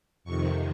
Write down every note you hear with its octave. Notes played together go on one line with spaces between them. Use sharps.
F2 C3 D#3 C#6